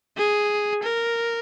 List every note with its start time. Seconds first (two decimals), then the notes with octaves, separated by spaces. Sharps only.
0.17 G#4
0.83 A#4